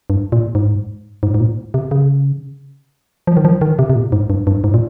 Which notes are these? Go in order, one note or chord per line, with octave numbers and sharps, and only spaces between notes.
G2
A#2
G#2
G#2
G#2
A#2
C3
C#3
F3
D#3
F3
D#3
C3
C3
A#2
G#2
G2
G2
G#2
A#2